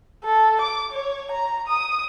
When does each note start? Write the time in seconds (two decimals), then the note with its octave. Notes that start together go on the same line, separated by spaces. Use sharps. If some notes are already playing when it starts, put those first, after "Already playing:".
0.24 A4
0.61 D6
0.91 C#5
1.31 A#5
1.67 D#6